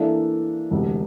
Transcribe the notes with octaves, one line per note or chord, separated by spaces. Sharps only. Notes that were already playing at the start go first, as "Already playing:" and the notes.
Already playing: E3 A#3 D4 A4 E5
E1 D2 C3